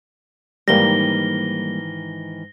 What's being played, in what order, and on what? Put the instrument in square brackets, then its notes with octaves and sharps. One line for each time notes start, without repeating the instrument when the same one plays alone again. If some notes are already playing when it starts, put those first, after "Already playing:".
[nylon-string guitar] G#2 D#3 E3 [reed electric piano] G3 A#3 [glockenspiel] A#6 G7